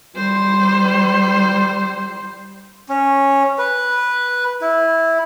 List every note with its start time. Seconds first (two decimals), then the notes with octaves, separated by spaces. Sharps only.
0.16 G3 C5
2.89 C#4
3.58 B4
4.61 E4